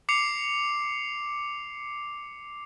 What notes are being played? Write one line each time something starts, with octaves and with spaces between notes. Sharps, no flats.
D6 C7 C#7 F7